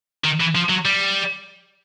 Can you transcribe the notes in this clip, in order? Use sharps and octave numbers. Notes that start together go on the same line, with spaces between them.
D#3
E3
F3
F#3
G3